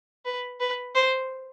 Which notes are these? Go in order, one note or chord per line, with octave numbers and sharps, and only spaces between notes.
B4
B4
C5